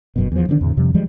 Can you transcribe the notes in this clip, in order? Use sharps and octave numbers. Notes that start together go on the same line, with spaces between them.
G1 F#2 B2
E2 F3
D3 D#3 C4 D4
E2 A2 C#3
F2 C3 F3 G3
E3 F3 G3 G#3